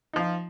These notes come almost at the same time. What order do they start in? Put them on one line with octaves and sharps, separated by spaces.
D#4 F3 F4